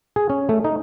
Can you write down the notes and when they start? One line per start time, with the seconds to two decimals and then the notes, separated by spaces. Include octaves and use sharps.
0.16 G#4
0.30 C#4
0.49 A3
0.64 D#4